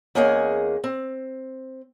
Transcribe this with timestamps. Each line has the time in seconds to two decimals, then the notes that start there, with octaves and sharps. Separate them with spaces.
0.15 E2 A#3 C#4 G#4 D#5 F#5
0.84 C4